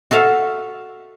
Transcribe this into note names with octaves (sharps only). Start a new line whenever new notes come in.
F#4 A4 E5 F5